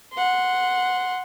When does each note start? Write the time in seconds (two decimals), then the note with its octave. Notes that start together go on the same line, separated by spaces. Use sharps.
0.14 F#5 C6